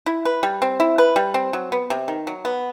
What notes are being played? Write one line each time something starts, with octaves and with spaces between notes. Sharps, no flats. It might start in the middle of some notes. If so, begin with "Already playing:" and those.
E4
B4
G3
C4
E4
B4
G3
C4
F#3
B3
C3
D#3
F#3
B3